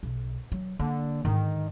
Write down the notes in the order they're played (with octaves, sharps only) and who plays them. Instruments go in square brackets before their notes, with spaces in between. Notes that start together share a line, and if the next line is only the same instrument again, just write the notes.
[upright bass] B1
F#3
[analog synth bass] D3 [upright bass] A#3
[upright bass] G#2 D3 [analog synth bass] D#3